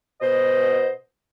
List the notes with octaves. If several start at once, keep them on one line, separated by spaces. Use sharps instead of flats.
B2 C5 D#5